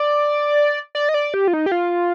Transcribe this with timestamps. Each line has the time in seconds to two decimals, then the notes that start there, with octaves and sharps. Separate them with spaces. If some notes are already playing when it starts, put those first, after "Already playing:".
Already playing: D5
0.95 D5
1.09 D#5
1.14 D5
1.34 G4
1.48 F4
1.53 D#4
1.66 G4
1.72 F4